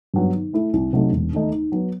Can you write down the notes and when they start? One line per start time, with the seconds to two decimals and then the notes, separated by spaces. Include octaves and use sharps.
0.14 G2 F#3 B3
0.34 D#3
0.53 A3 E4
0.73 C2
0.93 C3 F#3 A3 D#4
1.12 E1
1.33 D#2 D#3 A3 D#4
1.53 D#3
1.72 F#3 B3